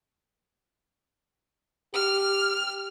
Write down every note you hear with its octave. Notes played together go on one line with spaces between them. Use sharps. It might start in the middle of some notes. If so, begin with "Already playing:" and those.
G4 F6